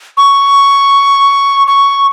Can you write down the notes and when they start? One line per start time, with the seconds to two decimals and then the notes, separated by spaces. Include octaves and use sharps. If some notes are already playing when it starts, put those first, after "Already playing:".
0.17 C#6
1.67 C#6